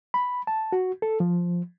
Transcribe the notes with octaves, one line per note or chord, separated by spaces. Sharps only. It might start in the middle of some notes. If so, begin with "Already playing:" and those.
B5
A5
F#4
A4
F3